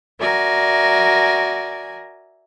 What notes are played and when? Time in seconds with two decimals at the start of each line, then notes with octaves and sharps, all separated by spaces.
0.19 F#4 A#4 D5 E5 G#5